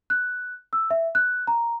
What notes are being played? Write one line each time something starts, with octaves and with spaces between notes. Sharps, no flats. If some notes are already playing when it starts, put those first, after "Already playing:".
F#6
E6
E5
F#6
A#5